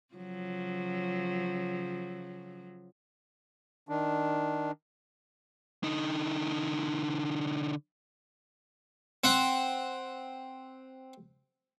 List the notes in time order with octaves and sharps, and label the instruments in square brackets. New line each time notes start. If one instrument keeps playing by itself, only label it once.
[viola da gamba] C#3 F3 F#3
[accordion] D#3 D4
[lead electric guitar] D3 D#4
[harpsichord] C4 F#5